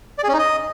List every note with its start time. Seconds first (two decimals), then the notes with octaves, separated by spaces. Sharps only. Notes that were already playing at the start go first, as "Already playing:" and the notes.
0.18 D5
0.23 G#4
0.28 C#4
0.33 D#4
0.38 D#5